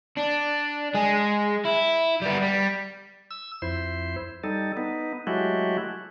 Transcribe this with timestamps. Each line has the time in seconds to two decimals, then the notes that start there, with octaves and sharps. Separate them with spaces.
0.17 D4
0.94 G#3 G#4
1.65 E4
2.22 G3 B3
2.42 G3
3.31 E6
3.62 F2 E4 C5
4.44 G3 D#4 A4
4.77 B3 D#4
5.27 F#3 G#3 A3 E4 F#4 G4